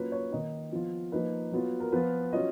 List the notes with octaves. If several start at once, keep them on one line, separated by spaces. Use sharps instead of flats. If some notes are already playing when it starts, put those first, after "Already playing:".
Already playing: F#3 A#3 C#4 F4 B4
C#5
D#3 A#3 D#4 D#5
F3 B3 F4
F3 A#3 D#4 B4
F#3 B3 F4
A#4
F3 B3 F4 B4
F#3 C#4 F4 D#5